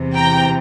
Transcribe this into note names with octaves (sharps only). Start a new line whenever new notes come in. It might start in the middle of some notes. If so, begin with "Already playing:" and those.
Already playing: E2 C3 E3
G5 A#5